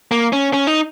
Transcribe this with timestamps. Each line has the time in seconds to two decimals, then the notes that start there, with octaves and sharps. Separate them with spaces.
0.11 A#3
0.33 C#4
0.53 C#4
0.67 D#4